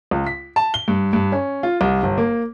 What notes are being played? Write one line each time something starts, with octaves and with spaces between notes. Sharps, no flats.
C#2
B6
A5
G7
G2
G2
C#4
F4
C2
G1
A#3